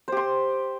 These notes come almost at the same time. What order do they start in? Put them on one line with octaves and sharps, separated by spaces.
C5 G4 C6